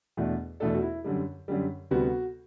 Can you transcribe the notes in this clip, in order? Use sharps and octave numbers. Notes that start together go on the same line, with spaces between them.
E2 B2 A3 D4
E2 B2 A3 D4 A4
F#4
E4
F#2 D3 G3
F#2 D3 G3
D2 C3 G3 B3 F#4